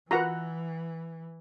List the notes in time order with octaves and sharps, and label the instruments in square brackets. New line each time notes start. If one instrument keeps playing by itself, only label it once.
[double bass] E3 [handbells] F4 F#4 A#4 [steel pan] B4 F#5 A#5